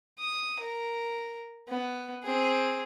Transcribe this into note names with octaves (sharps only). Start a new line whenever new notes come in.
D#6
A#4
B3
C4 G#4